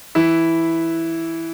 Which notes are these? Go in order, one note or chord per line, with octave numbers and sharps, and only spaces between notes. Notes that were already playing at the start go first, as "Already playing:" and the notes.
E3 E4